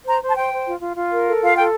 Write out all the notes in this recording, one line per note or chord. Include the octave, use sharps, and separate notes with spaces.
C5 A#5
C5
A5
C5 G5
C5
F4
F4
F4
A#4
A4
F4 F5
A4 G5